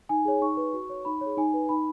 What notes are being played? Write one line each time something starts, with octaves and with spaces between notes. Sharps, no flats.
D#4 G#5
G#4 C#5
D#4 C#6
B4
F#4
C#5
D#4 B5
G#4 C#5
D#4 G#5
B4
D#4 B5